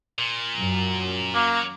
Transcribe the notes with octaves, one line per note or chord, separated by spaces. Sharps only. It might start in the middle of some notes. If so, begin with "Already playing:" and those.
A#2
F#2
F#3 A#3